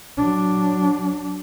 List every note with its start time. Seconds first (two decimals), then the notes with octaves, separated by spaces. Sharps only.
0.18 F#3 D4